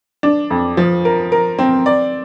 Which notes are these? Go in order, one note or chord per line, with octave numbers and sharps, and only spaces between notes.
D4
F2
F3
A#4
A#4
C4
D5